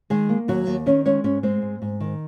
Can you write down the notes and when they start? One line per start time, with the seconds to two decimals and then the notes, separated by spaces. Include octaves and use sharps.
0.10 D#3 G#3 G#4
0.29 A#3
0.48 D#2 F#3 F#4
0.67 D#2
0.86 D#3 C#4 C#5
1.05 G#3 C#4 C#5
1.24 G#2 C#4 C#5
1.43 G#3 C4 C5
1.62 G#2
1.82 G#2
2.00 D#3